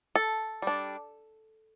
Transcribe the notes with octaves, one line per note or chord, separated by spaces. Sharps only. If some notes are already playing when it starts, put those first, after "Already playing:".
A4
G3 D4